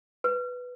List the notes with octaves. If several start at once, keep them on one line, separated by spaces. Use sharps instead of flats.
B4